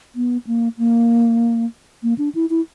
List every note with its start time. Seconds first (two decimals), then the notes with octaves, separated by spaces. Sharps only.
0.16 B3
0.47 A#3
0.78 A#3
2.03 A#3
2.18 D4
2.35 E4
2.50 E4